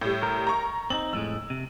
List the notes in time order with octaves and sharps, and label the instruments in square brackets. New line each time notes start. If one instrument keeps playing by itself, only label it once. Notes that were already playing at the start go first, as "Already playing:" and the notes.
[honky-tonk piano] A2 G3
[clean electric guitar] A#4
[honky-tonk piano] A#5 C#6
[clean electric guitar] C4 C#4 D#4 [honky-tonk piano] F#7
[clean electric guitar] F2 A2 G#3 [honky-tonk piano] E6
[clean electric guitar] C3